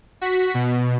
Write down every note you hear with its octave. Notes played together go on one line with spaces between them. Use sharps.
F#4 B6
B2